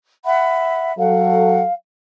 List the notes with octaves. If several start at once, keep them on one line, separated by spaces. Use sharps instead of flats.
E5 F#5 B5
F#3 A4 F5 F#5